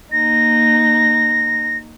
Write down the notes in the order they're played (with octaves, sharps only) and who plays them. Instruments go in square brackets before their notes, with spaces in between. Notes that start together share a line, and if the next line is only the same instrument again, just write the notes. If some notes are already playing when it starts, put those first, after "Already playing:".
[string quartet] A#3 D#4 [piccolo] A#6